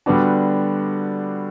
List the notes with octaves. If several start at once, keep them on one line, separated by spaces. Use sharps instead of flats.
D3 G3 B3 D4 F#4